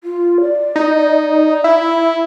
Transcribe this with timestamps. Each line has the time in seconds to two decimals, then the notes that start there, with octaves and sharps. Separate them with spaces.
0.04 F4
0.41 D5
0.76 D#4
1.64 E4